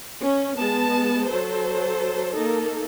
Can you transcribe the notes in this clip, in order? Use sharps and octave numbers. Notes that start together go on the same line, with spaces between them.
C#4
G#3 B3 A5
F#3 A4 C5
A#3 D#4 A4